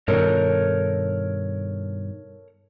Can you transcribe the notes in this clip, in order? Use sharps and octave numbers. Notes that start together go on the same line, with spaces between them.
G2 B2 D#3 A4 A#4 C#5